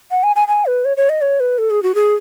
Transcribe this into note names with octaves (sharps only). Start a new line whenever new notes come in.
F#5
G#5
G#5
G#5
B4
C#5
C#5
D#5
C#5
B4
A4
G#4
F#4
G#4